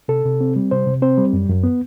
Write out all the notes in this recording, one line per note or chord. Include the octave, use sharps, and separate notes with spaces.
C3 A4
C3
C4
G3
C3 C5
C3
C4 C5
G3
F#2
F#2
B3